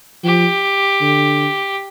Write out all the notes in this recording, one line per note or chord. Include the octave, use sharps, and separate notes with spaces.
F3 G4
D3